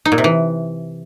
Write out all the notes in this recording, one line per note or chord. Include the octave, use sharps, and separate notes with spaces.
D#4
A#2
C3
E3